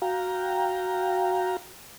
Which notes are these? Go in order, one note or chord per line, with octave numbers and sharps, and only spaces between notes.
F#4 F5 G5 A#5